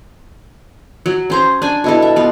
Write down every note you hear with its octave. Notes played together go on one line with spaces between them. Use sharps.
F#3
C#4 C5 A#5
D4 G#5
B2 E4 A4
E5
B3 F4